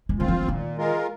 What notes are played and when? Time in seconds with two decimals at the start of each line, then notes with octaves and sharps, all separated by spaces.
0.09 G#3
0.19 D#3 C4 F4
0.28 F3
0.43 F3
0.48 A#2 D#3
0.77 G#3 F4 A#4